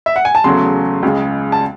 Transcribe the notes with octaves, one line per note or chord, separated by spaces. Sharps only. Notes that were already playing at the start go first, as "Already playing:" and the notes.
E5
F#5
G#5
A5
E2 C#3 F#3 A3 C6
C#2 C#3 G#3
A5